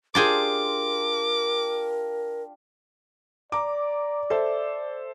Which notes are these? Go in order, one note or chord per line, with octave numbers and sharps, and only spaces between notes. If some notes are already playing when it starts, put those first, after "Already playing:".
D4 F4 G4 G#4 A#4 C5 D5 D6
D5 A#5 D6
A4 C5 E5